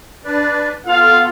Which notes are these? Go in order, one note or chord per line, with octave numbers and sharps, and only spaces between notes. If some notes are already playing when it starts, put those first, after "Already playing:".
D4 B4 D5
B3 F4 A4 F5